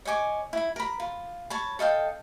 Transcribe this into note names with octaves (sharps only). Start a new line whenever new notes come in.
C#5 D#5 G#5 D6
E4 B5
A#4 B5
F4
C#5 A5 B5
A4 D#5 F5 G5